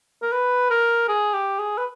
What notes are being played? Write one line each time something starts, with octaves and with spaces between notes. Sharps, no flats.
A#4
B4
A#4
G#4
G4
G#4
B4